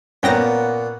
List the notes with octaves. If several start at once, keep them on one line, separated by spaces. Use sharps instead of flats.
G2 A#2 A#3 B3 C#4 F#5 G5 A#6